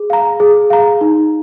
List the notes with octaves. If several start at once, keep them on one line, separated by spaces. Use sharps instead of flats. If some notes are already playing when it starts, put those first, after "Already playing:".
Already playing: G#4
F5 A#5
G#4
F5 A#5
D#4